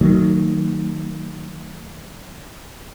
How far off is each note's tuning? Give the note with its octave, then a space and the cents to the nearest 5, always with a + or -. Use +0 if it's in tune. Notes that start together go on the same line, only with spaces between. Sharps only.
D#3 +0 F#3 +0 A3 +45